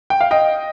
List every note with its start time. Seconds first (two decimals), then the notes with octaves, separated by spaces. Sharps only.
0.10 G5
0.21 F5
0.31 D#5 G5